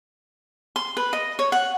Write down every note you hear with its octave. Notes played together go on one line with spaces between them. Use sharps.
C6
B4
D#5
C#5
F#5